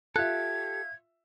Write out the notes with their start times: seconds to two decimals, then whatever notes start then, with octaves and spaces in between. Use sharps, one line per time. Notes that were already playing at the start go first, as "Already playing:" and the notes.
0.16 F4 G4 A4 E5 F#6 G#6